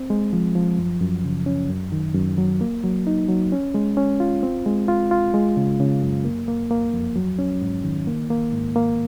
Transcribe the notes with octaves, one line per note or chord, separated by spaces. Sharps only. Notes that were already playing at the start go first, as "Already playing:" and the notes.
Already playing: C4
G#3
F3
F3
F#2
F#2
C#3
C#4
F#2
D#3
F#2
F#3
A#3
F#3
D#4
F#3
C#4
G#3
C#4
F4
C4
G#3
F4
F4
G#3
C#3
C#3
F#2
A#3
A#3
A#3
F2
F#3
C#4
G#2
D#3
A#3
A#3
G#2
A#3